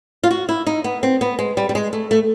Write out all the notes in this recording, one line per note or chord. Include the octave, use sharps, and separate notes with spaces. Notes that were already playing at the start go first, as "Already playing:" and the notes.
F4
F#4
E4
D#4
B3
C4
B3
G#3
G3
G3
G#3
A3
A3